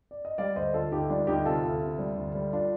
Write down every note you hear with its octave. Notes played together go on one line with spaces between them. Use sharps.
D5
D#5
G3 D5 F5
D2 C5 D#5
D2 F4 A4
D2 D#4 G4
G3 D4 F4
D2 D#4 G4
C3 F4 A4
D2
C3
G3
D2
G3
D4 F4